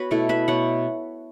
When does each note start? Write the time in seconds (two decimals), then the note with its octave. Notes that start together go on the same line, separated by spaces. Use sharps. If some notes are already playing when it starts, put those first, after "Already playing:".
Already playing: B3 F#4 B4 C#5
0.11 B2 A3 E4 A4
0.29 B4 E5
0.48 B2 A3 C#5 F#5